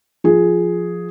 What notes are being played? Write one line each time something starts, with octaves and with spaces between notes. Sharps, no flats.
F3 G#4